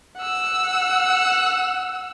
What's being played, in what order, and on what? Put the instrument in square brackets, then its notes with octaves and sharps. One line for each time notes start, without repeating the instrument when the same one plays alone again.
[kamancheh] F#5 E6